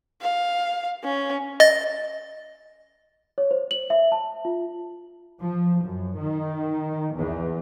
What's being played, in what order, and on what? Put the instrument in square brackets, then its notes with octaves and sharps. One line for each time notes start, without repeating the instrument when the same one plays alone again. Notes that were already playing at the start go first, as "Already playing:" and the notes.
[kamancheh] F5
C#4
[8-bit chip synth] D#5 A6
[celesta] C#5
C5
F#7
E5
A5
F4
[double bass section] F3
F#2
D#3
E2